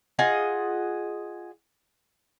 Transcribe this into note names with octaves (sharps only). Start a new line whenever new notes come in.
F4 G#4 D#5 F#5